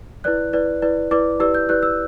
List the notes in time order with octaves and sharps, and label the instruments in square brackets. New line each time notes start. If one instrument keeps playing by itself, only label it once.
[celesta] E4 B4 D5 F#6
E4 B4 D5
E4 B4 D5
E4 B4 D5 D6
E4 G4 B4 D5 E6
G6
E4 G4 B4 D5 F#6
E6